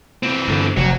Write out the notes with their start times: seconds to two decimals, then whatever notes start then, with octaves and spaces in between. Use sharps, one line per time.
0.23 E3 C4
0.48 G2 D3
0.77 F1 F#3